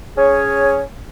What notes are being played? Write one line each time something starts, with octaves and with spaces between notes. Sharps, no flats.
C#4 G#4 C#5